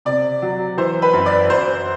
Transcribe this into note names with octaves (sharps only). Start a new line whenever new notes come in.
C3 D5
F#3
E3 C5
B4
F#2
D5
F#2 C5